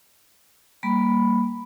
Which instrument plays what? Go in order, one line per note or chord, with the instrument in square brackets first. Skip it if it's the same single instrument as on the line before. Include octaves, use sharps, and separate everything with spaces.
[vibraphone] G3 A#3 B5